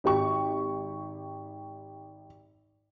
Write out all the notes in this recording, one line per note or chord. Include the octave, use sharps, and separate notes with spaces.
G#1 G4 C#6